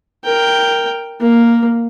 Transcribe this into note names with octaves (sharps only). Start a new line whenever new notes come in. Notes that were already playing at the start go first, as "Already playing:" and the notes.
A#4 G5
A#3